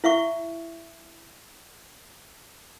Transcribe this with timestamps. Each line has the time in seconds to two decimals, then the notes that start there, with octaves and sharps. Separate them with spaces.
0.04 E4 E5 F5 C#6